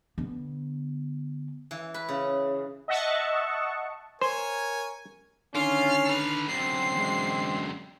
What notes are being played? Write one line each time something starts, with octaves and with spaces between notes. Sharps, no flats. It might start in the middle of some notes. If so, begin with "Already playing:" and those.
D3 B3
E3
B4
C#3
D#5 E5 F#5 A5 C#6
A#4 C5 C#5 G#5
D3 D#3 C#4 F4 F6 C7
A4 B4
F#2 D3 C4 C7
E2 G#3